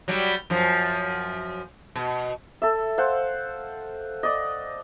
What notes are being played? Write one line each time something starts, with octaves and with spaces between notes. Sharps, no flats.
F#3 G3
F#2 F3
B2
A4 E5
C5 F5 F#5 C6
D5 D#5